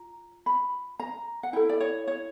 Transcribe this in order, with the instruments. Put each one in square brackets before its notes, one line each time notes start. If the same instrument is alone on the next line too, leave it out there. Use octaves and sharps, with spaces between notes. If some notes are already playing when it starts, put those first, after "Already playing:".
Already playing: [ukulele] F4 A#5
B5
A#5
F#5
E4 A4 G5
D5
C#5
C#5